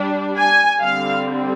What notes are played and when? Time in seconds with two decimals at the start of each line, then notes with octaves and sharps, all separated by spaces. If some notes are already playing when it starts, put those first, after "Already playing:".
Already playing: G3 D4
0.38 G#5
0.82 D3 G3 C4 F5